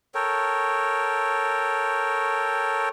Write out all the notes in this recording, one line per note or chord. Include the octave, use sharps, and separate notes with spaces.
A4 A#4 C#5 G5